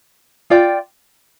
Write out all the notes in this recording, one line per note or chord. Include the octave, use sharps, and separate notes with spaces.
F4 D5 G5